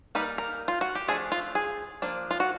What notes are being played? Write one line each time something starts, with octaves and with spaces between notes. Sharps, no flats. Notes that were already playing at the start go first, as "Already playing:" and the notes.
G3 A#3 D#4 B4
A#4
F4
F#4
G4
F3 A3 D4 G#4
F4
G#4
F3 A#3 D4
F4
F#4